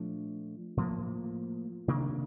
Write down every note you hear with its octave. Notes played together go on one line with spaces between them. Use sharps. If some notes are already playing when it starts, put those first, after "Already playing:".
Already playing: A#2 F3 A3 D4
A2 F3 A#3
C3 D#3 A#3 D4